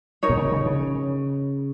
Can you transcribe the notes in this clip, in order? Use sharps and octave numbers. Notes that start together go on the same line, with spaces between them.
D#4 A#4 C#5
B2
C#3
C#3
C#3